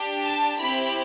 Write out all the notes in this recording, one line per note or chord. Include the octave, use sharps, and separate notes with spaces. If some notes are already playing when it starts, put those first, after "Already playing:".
Already playing: D4 G4
A5
C4 E4 G4 B5